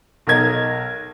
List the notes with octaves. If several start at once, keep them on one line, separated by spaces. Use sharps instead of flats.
B1 A#4 D#5 G#6